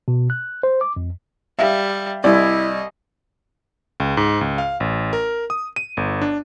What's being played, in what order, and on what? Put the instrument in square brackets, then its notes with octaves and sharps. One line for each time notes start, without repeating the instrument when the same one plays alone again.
[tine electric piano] B2
F#6
C5
D6
F2
[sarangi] G3 [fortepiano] E5 F5
[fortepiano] C2 [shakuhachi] E4 [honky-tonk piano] D5 [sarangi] D#5
[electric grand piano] C#2
G#2
C#2
F5
A1
A#4
D#6
D#7
G1
D4